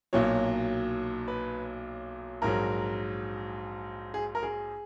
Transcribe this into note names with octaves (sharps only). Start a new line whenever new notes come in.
B1 A#2 F#3 C#5
B4
A#1 G#2 F#3 A#4
G#4
A#4
G#4